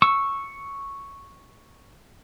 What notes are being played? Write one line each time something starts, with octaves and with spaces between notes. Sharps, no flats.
C#6 E6